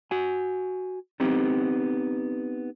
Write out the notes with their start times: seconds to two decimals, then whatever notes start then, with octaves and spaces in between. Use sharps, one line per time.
0.11 F#4 G#5
1.20 B3 C4 D#4 G4